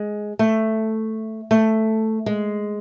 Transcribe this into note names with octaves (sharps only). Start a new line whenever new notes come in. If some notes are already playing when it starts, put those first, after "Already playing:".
Already playing: G#3
A3
A3
G#3